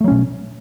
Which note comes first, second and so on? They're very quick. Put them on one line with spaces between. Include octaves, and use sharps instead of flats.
A3 F#3 C#4 B2